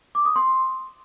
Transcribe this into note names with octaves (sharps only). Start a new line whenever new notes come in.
D6
D#6
C6